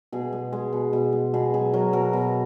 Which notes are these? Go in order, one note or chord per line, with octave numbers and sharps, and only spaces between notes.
B2 G#4
G#3
G#3
B2
B2
G#3
B2 G#4
F#3 G#4
F#3 A#4
B2 A#4
B2